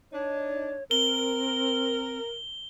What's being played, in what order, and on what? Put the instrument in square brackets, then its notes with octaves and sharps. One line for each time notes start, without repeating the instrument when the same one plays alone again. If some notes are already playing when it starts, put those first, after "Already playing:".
[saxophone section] D4 D#4 [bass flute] C#5
[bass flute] C4 [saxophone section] A#4 [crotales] G7